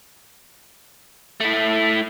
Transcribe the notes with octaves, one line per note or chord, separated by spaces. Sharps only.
A3 E4